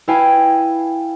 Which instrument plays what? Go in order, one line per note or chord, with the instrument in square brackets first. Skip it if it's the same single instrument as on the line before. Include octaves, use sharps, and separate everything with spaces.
[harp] E4 B4 F5 G5 G#5 B5